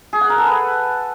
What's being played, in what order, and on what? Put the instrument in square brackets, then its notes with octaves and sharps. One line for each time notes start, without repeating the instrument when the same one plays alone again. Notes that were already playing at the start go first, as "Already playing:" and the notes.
[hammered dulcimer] G#4
F#5
A#4
A4
B4